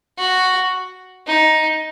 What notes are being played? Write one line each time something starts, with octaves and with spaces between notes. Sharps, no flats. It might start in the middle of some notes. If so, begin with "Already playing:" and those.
F#4
D#4